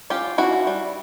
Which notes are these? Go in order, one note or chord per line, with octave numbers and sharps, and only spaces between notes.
C#4 F4 G4
C#4 E4 F#4
G3